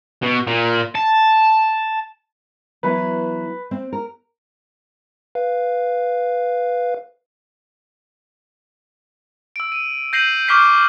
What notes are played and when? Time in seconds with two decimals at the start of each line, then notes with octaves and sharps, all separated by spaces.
0.23 B2
0.47 A#2
0.95 A5
2.83 E3 F#3 B3 B4
3.71 C4 C5
3.93 A#4
5.35 B4 F5
9.56 E6 D7
9.72 D#7
10.13 G6 A#6 C7 D#7 F#7
10.48 C#6 D6 F6 G6 B6 C7